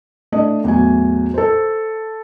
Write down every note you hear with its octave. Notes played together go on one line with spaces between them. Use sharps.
A3 D4 D#5
E2 A2 F#3 G#5
A4 C5